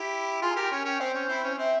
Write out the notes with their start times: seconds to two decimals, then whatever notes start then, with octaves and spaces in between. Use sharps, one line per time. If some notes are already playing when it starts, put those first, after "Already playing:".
Already playing: E4 G4
0.41 F4 G#4 C6
0.51 G#5
0.56 G4 A#4
0.61 G5
0.71 C#4 G#5
0.85 C#4 G5
1.00 C4 C5
1.15 C#4
1.29 C4 E4
1.44 C#4
1.58 C4 E5